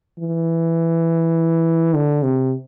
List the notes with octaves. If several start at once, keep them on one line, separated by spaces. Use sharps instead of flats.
E3
D3
C3